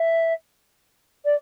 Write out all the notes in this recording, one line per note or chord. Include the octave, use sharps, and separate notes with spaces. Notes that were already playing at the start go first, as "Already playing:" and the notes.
Already playing: E5
D5